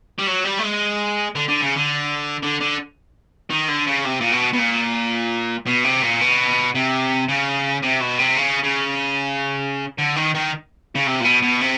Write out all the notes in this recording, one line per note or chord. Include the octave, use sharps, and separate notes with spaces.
G3
F#3
G3
A3
G#3
D3
D3
C#3
D3
D3
D3
D#3
D3
C#3
C3
A#2
B2
B2
A#2
B2
C3
A#2
B2
C3
C#3
C3
B2
C3
C#3
C#3
D3
D#3
D#3
C#3
C3
A#2
B2
B2
C3